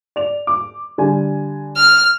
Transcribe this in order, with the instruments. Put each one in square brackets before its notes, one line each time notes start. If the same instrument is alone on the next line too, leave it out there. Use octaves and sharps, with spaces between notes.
[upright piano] D5 F7
D6
D3 G3 G#5
[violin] F6